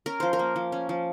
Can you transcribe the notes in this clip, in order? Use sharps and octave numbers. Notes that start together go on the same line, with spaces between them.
C#4 A#4
F3 C5
A#4
A#3
F3
C#4
F3